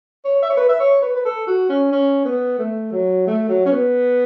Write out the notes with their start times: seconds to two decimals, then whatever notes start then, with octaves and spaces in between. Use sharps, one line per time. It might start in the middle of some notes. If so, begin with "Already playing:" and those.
0.25 C#5
0.42 E5
0.50 C#5
0.57 B4
0.69 E5
0.80 C#5
1.02 B4
1.16 B4
1.25 A4
1.47 F#4
1.69 C#4
1.92 C#4
2.25 B3
2.59 A3
2.92 F#3
3.27 A3
3.48 F#3
3.65 C#4
3.71 B3